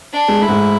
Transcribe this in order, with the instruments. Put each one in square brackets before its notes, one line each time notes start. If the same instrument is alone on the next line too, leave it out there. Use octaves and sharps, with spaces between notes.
[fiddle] D4
[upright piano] G#3
[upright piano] A3 [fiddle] E4
[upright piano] G#2 G#3